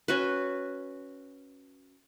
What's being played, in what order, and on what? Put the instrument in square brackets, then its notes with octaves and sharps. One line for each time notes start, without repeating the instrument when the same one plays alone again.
[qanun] C#4 F#4 B4